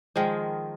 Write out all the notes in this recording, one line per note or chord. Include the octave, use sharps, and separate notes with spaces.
D#3 F3 G#3